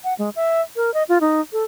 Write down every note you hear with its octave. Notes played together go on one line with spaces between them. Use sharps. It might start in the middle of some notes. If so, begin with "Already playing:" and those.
F#5
G#3
E5
A#4
D#5
F4
D#4
A4